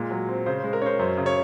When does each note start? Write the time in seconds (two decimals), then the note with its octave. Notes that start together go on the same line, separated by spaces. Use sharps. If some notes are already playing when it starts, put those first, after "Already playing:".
Already playing: A#2 G#3
0.11 F#3
0.29 C4
0.46 C#3 C5
0.60 C5
0.64 G#3
0.73 A#4
0.82 C#4 C#5
0.86 C5
0.99 F#2 C5
1.18 C#3
1.26 C#5